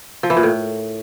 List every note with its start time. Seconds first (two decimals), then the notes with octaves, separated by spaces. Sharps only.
0.23 F3
0.30 E3
0.37 A#2
0.43 A2